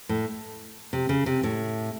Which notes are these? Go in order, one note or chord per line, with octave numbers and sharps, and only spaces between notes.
A2
C3
C#3
C3
A2